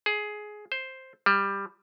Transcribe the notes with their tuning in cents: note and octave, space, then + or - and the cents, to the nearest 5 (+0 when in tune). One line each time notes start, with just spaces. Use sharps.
G#4 +15
C5 +5
G3 +10